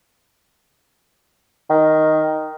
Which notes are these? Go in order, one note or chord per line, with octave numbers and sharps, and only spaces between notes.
D#3